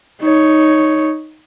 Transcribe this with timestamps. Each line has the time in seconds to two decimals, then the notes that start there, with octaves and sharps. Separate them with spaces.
0.21 D#4 C#5